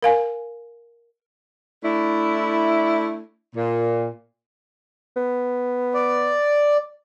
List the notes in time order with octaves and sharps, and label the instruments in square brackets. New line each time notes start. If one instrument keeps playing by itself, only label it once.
[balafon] A#4 F5 G#5
[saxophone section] A3 D4 E4
A#2
[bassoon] B3
[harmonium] D5